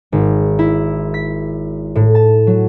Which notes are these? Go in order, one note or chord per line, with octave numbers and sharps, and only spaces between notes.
G#1
E4
B6
A2
A5
F#3